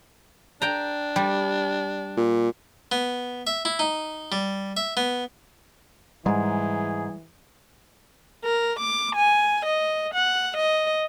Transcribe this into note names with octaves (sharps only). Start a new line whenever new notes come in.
D4 G5 A#5
G3
A#2
B3
E5
E4
D#4
G3
E5
B3
G#2 E3 G3 G#3 G#4
A#4
D6
G#5
D#5
F#5
D#5